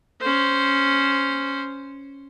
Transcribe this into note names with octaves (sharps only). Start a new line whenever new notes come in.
C#4 C5